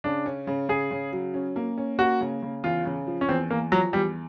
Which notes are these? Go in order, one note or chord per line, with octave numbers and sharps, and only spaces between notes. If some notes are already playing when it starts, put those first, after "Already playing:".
C#3 D4
C#4
C#3
C#3 G#4
C#3
F#3
C#4
A#3
C#4
A#3 F#4
C#3
C#3
E2 F4
C#3
F3
C#4
E2 C4
E2 A#3
F3 F#3
E2 G3